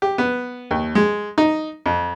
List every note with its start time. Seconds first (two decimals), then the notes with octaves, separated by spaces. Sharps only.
0.02 G4
0.18 B3
0.71 D#2
0.95 G#3
1.38 D#4
1.86 F2